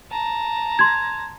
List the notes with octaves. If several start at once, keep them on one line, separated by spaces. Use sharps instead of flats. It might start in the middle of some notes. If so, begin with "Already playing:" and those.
A5 A#5
C6 G#6